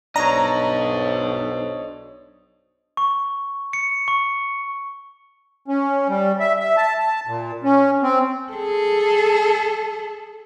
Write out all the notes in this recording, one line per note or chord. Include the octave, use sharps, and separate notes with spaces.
B1 D4 C5 C#5 D#5 A#5
C#6
C#7
C#6
C#4
G3
E5
E5
A5
A5
A#2
C#4
C4
G#4 A4